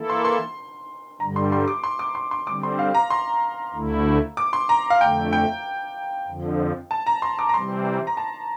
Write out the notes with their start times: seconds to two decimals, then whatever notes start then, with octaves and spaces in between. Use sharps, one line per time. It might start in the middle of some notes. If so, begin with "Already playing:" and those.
Already playing: E3 A#3 E4 A4
0.10 C6
0.25 C6
1.20 G2 D3 G3 A#5
1.36 C6
1.52 C6
1.68 D6
1.84 C6
1.99 D6
2.15 C6
2.31 C6
2.47 D3 G3 C4 D6
2.63 C6
2.79 F5
2.95 A#5
3.10 C6
3.74 D2 D3 A3 E4
4.37 D6
4.53 C6
4.69 A#5
4.90 F5
5.01 F2 D3 A3 G5
5.33 G5
6.28 F2 D3 F3
6.91 A5
7.07 A#5
7.22 C6
7.39 D6
7.49 A#5
7.54 C3 E3 G3 C4 C6
8.07 A#5
8.17 A5